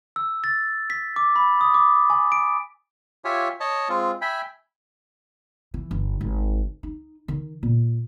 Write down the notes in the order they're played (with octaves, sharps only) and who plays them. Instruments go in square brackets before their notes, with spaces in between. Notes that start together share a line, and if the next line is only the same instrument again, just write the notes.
[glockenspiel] E6
A6
B6
D6
B5
D#6
D6
G#5
D7
[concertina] F4 G4 C#5 E5 G#5
C#5 D#5 A5
G#3 C4 F4
E5 G5 G#5 B5
[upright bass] E3
G1
G#1
D#4
D#3
A#2